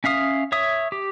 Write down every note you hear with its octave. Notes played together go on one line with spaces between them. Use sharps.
C#4 E5 F5 D#6
C#5 E5 D#6
G4